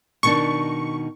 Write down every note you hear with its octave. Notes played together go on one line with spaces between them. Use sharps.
B2 D#3 D4 C#6